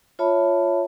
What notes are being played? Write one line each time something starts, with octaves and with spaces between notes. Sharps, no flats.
F4 C#5 E5 A5 B5